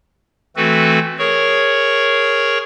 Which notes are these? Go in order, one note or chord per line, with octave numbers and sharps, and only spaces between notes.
E3 A3 C4 F#4 A4 B4
G#4 A#4 C#5 C#6